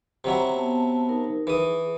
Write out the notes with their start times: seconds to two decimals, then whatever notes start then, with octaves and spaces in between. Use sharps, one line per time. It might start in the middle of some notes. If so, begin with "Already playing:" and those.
0.24 C3 F#3 E4
0.55 B3 A5
1.09 D#4 A#4
1.47 E3 G#4 D#6